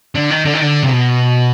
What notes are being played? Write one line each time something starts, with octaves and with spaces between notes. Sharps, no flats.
D3
D#3
D3
D#3
D3
C3
B2